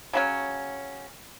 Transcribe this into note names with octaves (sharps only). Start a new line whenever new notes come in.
C#3 F#3 C#4